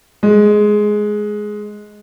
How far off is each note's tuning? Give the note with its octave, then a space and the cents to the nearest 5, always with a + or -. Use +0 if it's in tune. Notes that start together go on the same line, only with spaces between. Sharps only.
G#3 +10